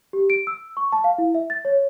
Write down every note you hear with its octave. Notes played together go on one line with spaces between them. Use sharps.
G4
D7
E6
C#6
A5
F5
E4
E5
A6
C#5